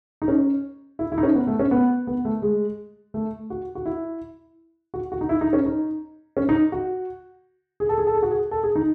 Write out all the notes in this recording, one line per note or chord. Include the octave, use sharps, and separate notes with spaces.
D#4
C#4
E4
E4
D#4
C#4
B3
A3
C#4
B3
B3
A3
G#3
A3
F#4
F#4
E4
F#4
F#4
D#4
E4
D#4
C#4
D#4
C#4
D#4
F#4
G#4
A4
G#4
A4
G#4
F#4
G#4
A4
G#4
D#4